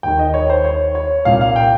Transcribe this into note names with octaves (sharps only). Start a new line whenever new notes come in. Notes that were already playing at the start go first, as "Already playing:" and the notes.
D#2 D#3 G5
D#5
C#5
C5
C#5
C#5
C2 A#2 F5
F5
G5